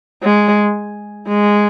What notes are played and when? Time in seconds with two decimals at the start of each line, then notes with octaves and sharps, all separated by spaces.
0.23 G#3
1.28 G#3